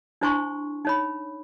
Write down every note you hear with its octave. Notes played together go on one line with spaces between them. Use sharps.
D4 E4 C5 G#5 C6 C#6
D#4 C#5 B5